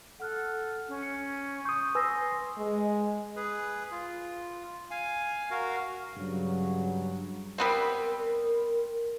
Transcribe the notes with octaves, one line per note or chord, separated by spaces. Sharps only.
A4 F#5 F6 F#6
C#4
C#7
C6 C#6 D#6 G6
B4 G#5 C6 D#6 E6 A#6
G#3
G#4 B4
F4
F5 G#5
F#4 A#4 F5
G2 C#3 F#3
G3 B3 C4 A#4